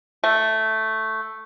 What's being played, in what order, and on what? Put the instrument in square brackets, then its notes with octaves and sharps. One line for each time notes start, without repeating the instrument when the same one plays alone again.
[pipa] A3